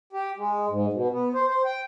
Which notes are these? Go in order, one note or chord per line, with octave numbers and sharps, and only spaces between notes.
G4
G#3
G#2
B2
B3
C5
C5
G5